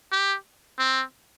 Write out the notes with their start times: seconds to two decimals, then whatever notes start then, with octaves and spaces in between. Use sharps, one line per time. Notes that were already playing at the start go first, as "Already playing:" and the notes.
0.12 G4
0.79 C4